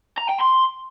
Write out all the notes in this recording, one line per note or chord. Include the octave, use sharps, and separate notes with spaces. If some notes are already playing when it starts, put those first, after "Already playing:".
A#5
G5
C6